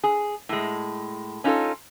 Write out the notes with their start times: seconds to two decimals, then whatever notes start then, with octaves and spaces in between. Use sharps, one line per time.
0.04 G#4
0.49 A2 G#3
1.44 C#4 D#4 F4 G#4 A4